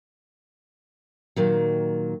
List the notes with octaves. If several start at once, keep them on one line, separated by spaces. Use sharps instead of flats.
A#2 D#3 F#3